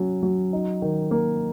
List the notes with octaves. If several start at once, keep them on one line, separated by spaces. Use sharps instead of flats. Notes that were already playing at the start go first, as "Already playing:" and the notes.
Already playing: F#3 C#4
F#3
D#4
D#3
A#3